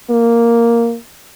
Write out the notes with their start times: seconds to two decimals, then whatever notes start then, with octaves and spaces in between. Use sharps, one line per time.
0.10 A#3